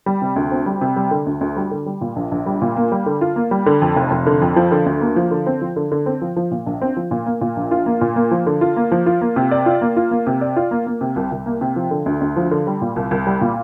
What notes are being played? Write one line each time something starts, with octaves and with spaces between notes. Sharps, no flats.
G3
C3
D2
C4
G3
C3
G3
D3
D2
D2
G3
D3
G3
A#2
A#1
A#1
G3
A#2
A#3
G3
D3
F4
A#3
G3
D3
F2
F1
F1
D3
F2
F3
D3
D2
A#3
F3
D3
C4
F3
D3
D3
C4
F3
F3
A#2
A#1
C4
F3
A#2
A#3
A#2
A#1
F4
A#3
A#2
A#3
F3
D3
F4
A#3
F3
F4
A#3
C3
D5
F4
A#3
F4
A#3
C3
D5
F4
A#3
A#3
C3
C2
C2
A#3
C3
F3
D3
D2
D2
F3
D3
G3
A#2
C2
C2
G3
A#2